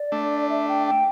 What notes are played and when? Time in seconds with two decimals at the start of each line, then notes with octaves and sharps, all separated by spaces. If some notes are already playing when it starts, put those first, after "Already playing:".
Already playing: D5
0.12 A3 D4
0.41 D5
0.49 E5
0.69 G5
0.87 G5